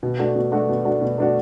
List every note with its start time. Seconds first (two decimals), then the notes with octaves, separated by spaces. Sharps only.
0.03 B2
0.19 A3 D4 F#4
0.35 B2
0.52 A3 D4 F#4
0.69 B2
0.85 A3 D4 F#4
1.02 B2
1.18 A3 D4 F#4